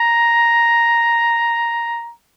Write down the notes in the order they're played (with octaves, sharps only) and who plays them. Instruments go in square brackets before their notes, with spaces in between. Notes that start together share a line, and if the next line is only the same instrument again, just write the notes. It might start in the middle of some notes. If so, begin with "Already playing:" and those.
Already playing: [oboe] A#5